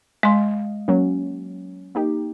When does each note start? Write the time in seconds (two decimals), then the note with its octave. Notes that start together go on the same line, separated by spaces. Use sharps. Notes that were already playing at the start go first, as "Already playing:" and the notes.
0.23 G#3 D#5 F5 C6
0.88 F#3 A#3 C#4
1.95 A#3 D#4 G4